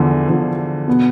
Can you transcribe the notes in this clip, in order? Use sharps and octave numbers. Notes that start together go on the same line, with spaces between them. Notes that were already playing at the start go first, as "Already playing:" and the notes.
Already playing: E2 D3 F3
E2 D3 F3
B2 B3